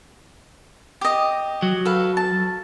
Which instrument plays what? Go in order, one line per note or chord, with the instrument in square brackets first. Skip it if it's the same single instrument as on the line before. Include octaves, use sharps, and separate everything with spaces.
[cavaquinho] G4 D#5
[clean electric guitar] F#3
[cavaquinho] A4 B4 F5
A5